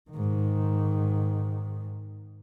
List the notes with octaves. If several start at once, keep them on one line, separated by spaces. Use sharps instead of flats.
G#2 D#3